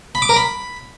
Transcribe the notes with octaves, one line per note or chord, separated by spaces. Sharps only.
B5
D6
A#4
B5